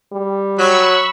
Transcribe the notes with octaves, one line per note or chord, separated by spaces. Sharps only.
G3
F#3 B5 C#6 E6